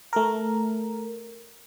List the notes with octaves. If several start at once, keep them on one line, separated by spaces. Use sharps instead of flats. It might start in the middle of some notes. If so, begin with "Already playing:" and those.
A3 A#4